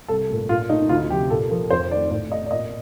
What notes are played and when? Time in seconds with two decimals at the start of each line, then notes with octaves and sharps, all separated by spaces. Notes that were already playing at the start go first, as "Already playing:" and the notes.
0.08 C2 A4
0.30 A#2 A3
0.49 A#2 F4
0.69 A3 D#4
0.89 D2 F4
1.10 C3 F3 G4
1.30 A#2 A4
1.50 F3 A#3
1.70 F2 C5
1.90 D#3 D5
1.95 A3
2.10 A2 D5
2.31 A3 D#5
2.46 D5
2.51 A#2 D#5